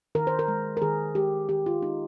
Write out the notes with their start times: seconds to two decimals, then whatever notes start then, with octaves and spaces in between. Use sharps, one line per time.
0.15 D#3 A#4
0.27 C5
0.39 A#4
0.48 G#3
0.77 A#4
0.82 D#3 G#4
1.15 G#3 G4
1.49 D#3 G4
1.66 F4
1.82 G#3 D#4